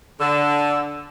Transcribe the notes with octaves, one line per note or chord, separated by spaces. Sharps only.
D3 E6